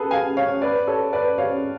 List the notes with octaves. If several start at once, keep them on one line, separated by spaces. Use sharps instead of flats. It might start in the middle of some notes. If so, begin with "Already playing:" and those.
Already playing: G#4 A4 B4
F5 G#5
C#5 F5
B4 D5
A4 C#5
B4 D5
C#5 F5